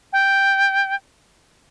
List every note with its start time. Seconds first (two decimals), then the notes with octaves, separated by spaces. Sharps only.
0.13 G5